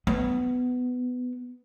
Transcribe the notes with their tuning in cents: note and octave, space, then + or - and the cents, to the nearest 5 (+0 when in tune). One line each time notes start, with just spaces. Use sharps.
B3 +15